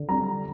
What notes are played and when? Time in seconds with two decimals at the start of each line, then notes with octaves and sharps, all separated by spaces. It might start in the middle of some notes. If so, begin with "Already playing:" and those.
Already playing: D3
0.09 G3 A#5